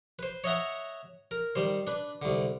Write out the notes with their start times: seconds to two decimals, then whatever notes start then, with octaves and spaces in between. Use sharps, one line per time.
0.19 B4 C5
0.44 C#5 D#5 E5 F#5 A#5
1.31 A#4
1.56 D#3 G3 C5
1.87 D4 B4
2.22 C2 D3